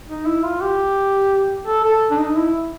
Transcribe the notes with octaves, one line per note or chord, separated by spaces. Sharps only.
D#4
E4
F4
G4
A4
A4
D4
D#4
E4